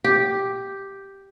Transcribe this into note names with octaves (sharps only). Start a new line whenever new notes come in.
G4